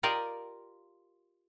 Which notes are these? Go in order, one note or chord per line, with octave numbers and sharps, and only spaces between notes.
F4 G4 A#4 D5 D#5